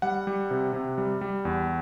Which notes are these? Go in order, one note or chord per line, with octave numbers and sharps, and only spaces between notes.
G3 F#5
G3
C3
C3
G3
G3
E2